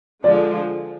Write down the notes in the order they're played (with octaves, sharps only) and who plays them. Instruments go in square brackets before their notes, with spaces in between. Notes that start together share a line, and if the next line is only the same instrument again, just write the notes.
[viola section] D3 F3 G#3 [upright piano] D5